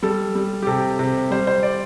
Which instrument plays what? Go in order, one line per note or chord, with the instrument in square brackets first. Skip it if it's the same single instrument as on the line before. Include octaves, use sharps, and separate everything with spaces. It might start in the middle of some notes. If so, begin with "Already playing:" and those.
[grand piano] G3 A4
G3
G4
C3 A4
C3
G3 C5
C5
D5